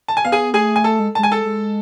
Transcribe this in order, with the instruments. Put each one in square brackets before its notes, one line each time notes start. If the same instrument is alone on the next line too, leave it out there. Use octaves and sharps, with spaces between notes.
[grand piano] A5
G#5
[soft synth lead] B3 [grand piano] F5
[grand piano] G#4 G#5
[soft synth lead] A3 [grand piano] G#4 G#5
[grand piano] G#5
A4 A5
[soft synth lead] G#3
[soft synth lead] G#3 [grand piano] A5
[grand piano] G#5
A4 A5
[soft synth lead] G#3